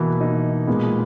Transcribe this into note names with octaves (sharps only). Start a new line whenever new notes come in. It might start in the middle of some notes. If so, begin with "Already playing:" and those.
Already playing: B2 E3 A#3 E4
D#4
A#2 G#3 B3